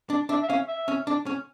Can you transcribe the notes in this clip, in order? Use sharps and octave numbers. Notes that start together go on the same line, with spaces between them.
D4
D4 E5
E5
C#4 F5
E5
C#4
D4
C#4